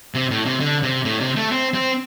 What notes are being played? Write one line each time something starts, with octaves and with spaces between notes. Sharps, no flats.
C3
A2
C3
D3
C3
A2
C3
A3
C4
C4